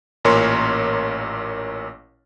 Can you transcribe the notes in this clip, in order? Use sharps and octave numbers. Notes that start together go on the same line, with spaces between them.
A1 A#2 A#4 C#5 C6